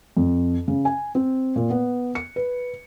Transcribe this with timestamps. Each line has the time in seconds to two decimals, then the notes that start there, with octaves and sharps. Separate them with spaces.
0.17 F2
0.68 C#3
0.85 G#5
1.15 C4
1.56 A#2
1.70 B3
2.15 C#7
2.36 B4